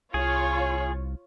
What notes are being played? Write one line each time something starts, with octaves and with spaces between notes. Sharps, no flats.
C2 F4 G#4 C#5